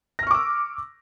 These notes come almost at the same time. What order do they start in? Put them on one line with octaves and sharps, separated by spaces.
A#6 F6 C#6 D6 E6